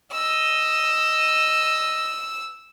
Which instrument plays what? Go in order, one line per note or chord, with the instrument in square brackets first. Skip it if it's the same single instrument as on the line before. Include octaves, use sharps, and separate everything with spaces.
[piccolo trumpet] D#5 [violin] E6